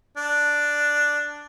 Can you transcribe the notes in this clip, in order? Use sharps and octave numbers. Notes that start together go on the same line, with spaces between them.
D4